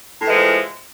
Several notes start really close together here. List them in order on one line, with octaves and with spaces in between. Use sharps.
A2 E3 G#3 F3